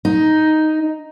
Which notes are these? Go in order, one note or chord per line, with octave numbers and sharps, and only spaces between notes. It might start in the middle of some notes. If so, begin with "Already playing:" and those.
D#4